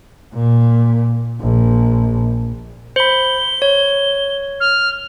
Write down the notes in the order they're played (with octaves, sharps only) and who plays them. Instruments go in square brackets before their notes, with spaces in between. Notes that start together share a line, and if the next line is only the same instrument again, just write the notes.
[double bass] A#2
A#1
[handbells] C5 B5 [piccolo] G7
[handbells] C#5
[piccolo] F6